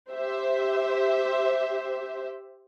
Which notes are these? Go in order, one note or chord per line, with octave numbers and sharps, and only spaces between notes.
G4 C5 E5